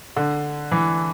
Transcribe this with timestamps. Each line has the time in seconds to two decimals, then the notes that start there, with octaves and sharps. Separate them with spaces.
0.17 D3
0.72 E3